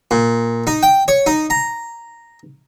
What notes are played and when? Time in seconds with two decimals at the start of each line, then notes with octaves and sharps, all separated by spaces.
0.11 A#2
0.67 D#4
0.83 G5
1.08 C#5
1.26 D#4
1.50 A#5